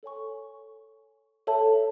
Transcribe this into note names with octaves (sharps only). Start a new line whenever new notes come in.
A4 C#5 G#5 C#6
A4 C#5 E5 A5